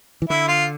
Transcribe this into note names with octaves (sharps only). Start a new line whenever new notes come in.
E3
D3 E4
F4